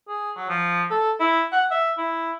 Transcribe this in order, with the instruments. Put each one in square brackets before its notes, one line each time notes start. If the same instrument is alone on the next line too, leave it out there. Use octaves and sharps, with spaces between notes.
[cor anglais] G#4
F#3
F3
A4
E4
F#5
E5
E4